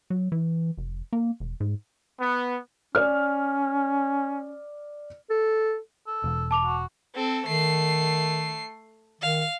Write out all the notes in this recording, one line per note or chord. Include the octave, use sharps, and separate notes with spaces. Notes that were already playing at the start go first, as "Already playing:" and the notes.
F#3
E3
F1
A#3
E1
G#2
B3
C#4 D5 F6
A4
A4
E1
A5 D6 F7
F#4
C4 A4
D#3 A3 C7
D#3 F5